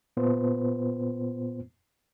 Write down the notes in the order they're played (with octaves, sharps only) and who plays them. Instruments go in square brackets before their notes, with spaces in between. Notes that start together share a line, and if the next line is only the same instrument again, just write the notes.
[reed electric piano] A#2 B3 F4 B4 C5